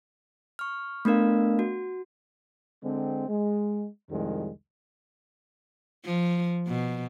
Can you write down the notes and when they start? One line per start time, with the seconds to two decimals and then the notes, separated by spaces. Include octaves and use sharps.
0.59 C#6 F6
1.05 A3 B3 D4 A#4 F5
1.59 F#4
2.84 D3 G#3 C4
3.28 G#3
4.10 C2 F2 D#3 G3 G#3
6.05 F3
6.68 B2